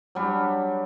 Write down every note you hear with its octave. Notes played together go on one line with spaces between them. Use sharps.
F#3 G3 D4